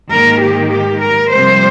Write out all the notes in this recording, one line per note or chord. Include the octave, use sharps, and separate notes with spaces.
G#2 D#3 A#3 A#4
G4
G4
A#4
F2 C3 G3 C5